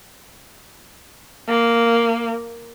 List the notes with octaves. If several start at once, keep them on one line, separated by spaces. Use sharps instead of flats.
A#3